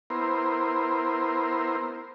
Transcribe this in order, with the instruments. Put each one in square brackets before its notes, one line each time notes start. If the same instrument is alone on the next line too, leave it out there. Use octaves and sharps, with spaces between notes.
[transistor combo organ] B3 E4 A#4 C5